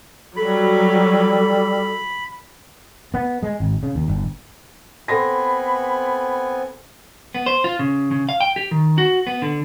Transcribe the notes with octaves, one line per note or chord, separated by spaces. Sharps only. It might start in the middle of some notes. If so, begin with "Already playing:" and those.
F#3 G3 A4 B5
B3
G#3
G#1
C#3
D#2
G1
B3 C4 A4 G#5 B5 C6 A#6
B3
C5
F4
C#3
C#3
F5
G5
G4
D#3
F#4
B3
D3